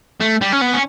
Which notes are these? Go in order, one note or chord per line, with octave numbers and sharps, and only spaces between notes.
A3
G3
C#4
B3
C#4